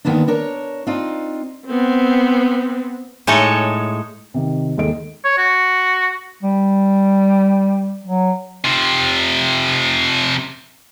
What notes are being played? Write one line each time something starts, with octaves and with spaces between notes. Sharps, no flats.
D3 D#3 A#3 B3 D4
D4 A#4 C#5
C4 D4 D#4 F4
B3 C4
A2 G#3 D#4 A4 C#5
C3 D#3
D#2 G#3 A4 D#5 D7
C#5
F#4
G3
F#3
C3 F3